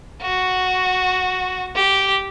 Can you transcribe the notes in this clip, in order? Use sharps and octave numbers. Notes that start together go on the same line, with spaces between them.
F#4
G4